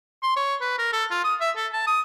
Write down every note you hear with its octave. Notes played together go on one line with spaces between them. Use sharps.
C6
C#5
B4
A#4
A4
F4
D#6
E5
A4
A5
D#6